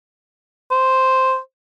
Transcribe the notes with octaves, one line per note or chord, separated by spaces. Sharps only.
C5